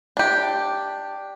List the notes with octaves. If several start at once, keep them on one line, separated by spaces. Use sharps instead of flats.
D4 G4